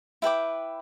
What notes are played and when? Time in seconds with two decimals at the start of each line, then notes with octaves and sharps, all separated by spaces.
0.22 E4 B4 G5 D6